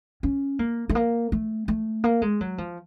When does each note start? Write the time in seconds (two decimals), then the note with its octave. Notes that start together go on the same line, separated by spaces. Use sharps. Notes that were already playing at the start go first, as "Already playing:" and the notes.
0.23 C#4
0.59 A#3
0.89 A3
0.95 A#3
1.32 A3
1.68 A3
2.04 A#3
2.22 G#3
2.41 F#3
2.58 F3